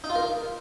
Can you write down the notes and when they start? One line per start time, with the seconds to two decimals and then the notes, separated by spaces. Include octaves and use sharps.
0.04 D#4
0.10 F4
0.15 A#4